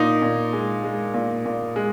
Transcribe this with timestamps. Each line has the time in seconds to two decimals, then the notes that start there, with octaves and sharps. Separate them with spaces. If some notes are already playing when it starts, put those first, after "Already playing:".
Already playing: A#2 D#4
0.22 A#2
0.53 G#3
0.84 G#3
1.14 A#2
1.46 A#2
1.76 G#3